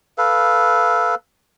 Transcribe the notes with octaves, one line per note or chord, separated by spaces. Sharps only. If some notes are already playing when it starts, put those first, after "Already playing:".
A4 B4 F5